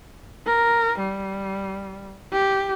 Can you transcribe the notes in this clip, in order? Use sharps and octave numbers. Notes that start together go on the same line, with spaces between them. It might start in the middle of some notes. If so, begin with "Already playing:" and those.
A#4
G3
G4